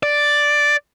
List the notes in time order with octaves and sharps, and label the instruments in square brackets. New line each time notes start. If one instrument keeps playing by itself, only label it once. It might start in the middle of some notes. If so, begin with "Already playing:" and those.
[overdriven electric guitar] D5